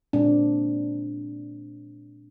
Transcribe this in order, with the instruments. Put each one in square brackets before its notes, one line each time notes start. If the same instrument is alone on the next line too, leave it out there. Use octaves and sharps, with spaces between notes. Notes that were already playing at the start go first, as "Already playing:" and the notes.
[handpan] A#2 G#3 C4 D4